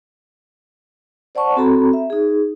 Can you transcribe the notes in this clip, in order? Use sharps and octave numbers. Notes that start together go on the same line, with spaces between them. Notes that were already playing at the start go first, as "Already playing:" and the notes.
C5 D5 F#5 A5 C#6
C4 F#4 A4 A#5 B5
E5
D#4 G#4